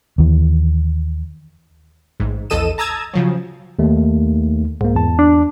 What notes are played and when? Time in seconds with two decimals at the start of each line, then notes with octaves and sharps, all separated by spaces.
0.18 D#2 E3
2.20 A1 G#2
2.50 A#1 E2 A4 D#5 D#7 E7
2.78 A5 A#5 D#6 E6 G#6 A6
3.14 C#3 F3 F#3
3.79 D#2 A3
4.81 C2 G#2 A#3
4.95 E2 A5
5.19 D4